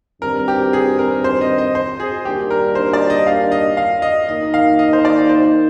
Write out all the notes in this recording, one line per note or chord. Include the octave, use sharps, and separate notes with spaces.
G2 D#3 G3 C4 A#4
G4
G#4
A#4
C5
D#5
D#5
C5
G#4
D#3 G3 A#3 D4 G4
A#4
C5
D5
D#5
F5
D#5
F5
D#5
D#3 A#3 D#4 D#5
F5
D#5
C5
D5
C5